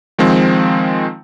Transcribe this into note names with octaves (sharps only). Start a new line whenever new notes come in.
D#3 F3 G#3 C4